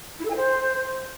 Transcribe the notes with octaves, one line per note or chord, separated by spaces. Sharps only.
E4
A4
G#5
C5